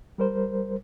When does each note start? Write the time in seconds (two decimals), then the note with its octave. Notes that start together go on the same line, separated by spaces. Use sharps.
0.18 G3 A#4 C5